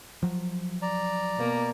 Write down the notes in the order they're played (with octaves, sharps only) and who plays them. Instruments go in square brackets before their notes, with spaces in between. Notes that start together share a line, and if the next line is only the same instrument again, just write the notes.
[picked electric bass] F3 F#3
[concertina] D5 A#5
[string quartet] B2 A#3